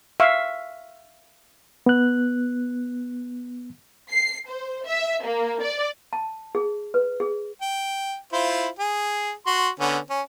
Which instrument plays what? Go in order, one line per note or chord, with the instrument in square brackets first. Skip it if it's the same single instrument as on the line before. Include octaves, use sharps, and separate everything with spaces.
[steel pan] E5 F5 C#6
[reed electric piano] B3 F#6
[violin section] C7
C5
E5
A#3
D5
[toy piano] A5
G#4
B4
G#4
[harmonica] G5
E4 F4 C5
G#4
F#4 C6
D3 B3 C#4
C#4